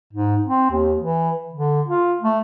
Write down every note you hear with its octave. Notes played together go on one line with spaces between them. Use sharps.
G#2
C4
D#2
E3
D3
F4
A3